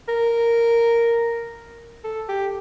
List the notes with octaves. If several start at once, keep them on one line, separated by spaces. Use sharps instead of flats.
A#4
A4
G4